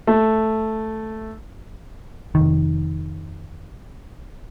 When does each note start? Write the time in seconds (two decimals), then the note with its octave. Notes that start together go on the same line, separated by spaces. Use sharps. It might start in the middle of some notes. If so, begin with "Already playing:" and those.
0.07 A3
2.35 F1 B1 D#3